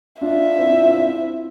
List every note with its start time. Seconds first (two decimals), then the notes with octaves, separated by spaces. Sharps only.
0.21 D4 F4 E5
0.58 C4 E4
0.70 D4 F4
0.82 D4 F4
0.94 C4 E4